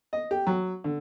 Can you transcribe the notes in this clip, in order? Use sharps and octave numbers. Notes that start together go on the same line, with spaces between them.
D#5
G4
F#3
D3